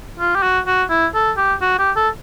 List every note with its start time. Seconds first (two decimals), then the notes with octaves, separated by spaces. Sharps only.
0.20 F4
0.35 G4
0.43 F#4
0.67 F#4
0.90 E4
1.14 A4
1.37 G4
1.61 F#4
1.79 G4
1.96 A4